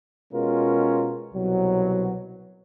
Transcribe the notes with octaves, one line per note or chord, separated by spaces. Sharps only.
B2 G#3 C#4 F4 A#4
C2 B2 F#3